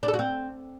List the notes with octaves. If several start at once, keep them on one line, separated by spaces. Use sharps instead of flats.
D4
A4
F#4
C4